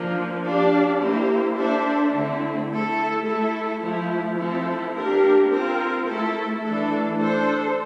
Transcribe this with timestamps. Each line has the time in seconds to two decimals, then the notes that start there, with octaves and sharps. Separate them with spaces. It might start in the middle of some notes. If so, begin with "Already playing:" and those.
Already playing: F3 A#3 D4
0.44 D4 G4 D5 F5
1.00 A#3 E4 G4 C5
1.56 D4 A4 C5 E5
2.13 D3 A3 C4 E4
2.69 A3 E4 A4
3.25 A3 E4 A4
3.81 F3 A3 E4
4.38 F3 C4 E4 A4
4.94 A#3 D4 G4 A#4
5.49 C4 F4 A#4
6.06 A3 E4 A4
6.62 E3 A3 D4 A4
7.18 D4 A4 C5